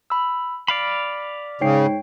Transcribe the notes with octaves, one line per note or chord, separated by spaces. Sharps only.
B5 E6
D5 F5 B5 C7
G#2 C#3 C#5 G5 C7